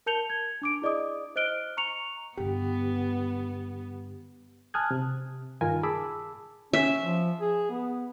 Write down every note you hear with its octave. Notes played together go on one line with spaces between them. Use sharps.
A#4 A5 G6 C#7 F7 G7
G#6
D4 D6 D7
E4 G#4 D5 D#5 D6 D#6
C5 D#5 F6 F#6 D7 G7
A#5 C#6 C#7 F7
G2 D3 B3 G4
G#5 A5 D#6 F6 F#6 G#6
C3
G2 D#3 F4 A#4 G#5
G#4 A5 B5 D6 E6
C#4 E5
F3
G#4
B3